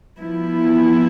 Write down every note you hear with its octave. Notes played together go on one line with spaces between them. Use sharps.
F3 B3 E4